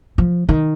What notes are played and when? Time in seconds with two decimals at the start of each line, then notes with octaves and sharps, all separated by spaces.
0.18 F3
0.49 D#3